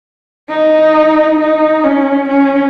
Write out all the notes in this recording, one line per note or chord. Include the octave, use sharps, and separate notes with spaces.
D#4
D#4
C#4
C#4